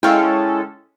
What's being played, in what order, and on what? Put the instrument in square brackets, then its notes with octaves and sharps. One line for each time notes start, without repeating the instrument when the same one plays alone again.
[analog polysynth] G#3 C#4 A4 [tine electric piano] E4 [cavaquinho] F5 G5